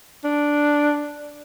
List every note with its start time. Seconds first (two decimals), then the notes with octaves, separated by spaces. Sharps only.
0.24 D4